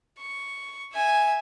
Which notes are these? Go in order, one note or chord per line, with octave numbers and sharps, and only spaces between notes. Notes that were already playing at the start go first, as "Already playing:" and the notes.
C#6
E5 G#5